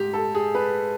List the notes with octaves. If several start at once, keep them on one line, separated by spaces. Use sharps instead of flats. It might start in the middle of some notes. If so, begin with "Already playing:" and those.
Already playing: G#2 G4
A4
G#4
B4